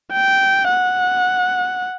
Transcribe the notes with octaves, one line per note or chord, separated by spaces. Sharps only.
G5
F#5